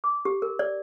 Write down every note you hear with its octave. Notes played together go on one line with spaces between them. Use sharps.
D6
G4
A#4
D5